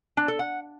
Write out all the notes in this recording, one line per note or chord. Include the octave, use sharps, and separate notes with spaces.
D4
A4
F#5